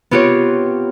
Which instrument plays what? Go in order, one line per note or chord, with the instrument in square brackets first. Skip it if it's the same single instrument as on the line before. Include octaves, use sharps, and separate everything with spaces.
[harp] B3 C4 F4 G4 C#5